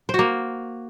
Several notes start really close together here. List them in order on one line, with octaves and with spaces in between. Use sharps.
C5 F#4 A#3